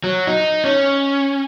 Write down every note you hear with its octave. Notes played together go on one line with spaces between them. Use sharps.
F#3
D#4
C#4